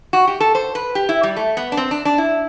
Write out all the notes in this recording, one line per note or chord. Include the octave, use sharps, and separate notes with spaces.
F#4
G4
A4
C5
B4
G4
E4
G3
A3
B3
D4
C4
D4
D4
E4